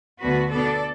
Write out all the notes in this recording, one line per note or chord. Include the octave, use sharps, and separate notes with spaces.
D2 D3 B3 F#4 B4
B2 B3 D4 A4 D5